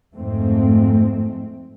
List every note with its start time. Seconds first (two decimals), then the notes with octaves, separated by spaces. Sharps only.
0.14 F2 G#2 A3 C4